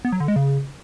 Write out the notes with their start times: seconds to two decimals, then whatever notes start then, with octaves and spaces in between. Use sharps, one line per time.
0.05 B3
0.12 F#3
0.20 D3
0.28 G#3
0.36 C#3